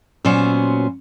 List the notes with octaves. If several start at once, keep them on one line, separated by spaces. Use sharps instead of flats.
A#2 F#3 B3 C#4 C5